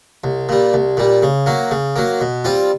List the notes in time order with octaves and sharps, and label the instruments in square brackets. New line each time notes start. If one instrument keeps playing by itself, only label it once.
[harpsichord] C2
A#2 G3
C2
A#2 G3
C#3
F#3 A#3
C#3
F#3 A#3
B2
G3 C4 F4